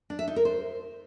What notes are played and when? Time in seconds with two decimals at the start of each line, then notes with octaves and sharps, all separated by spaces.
0.10 D4
0.19 E5
0.28 D#4
0.36 A#4
0.45 C5